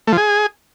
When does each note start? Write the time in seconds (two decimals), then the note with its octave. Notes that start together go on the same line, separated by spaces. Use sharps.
0.07 A3
0.12 F3
0.17 G#4